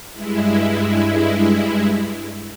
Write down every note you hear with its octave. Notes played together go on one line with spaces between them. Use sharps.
G2 G#3 E4